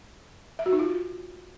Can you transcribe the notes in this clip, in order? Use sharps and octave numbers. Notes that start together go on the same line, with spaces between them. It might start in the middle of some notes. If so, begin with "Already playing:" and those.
E5
F#4
D#4
F4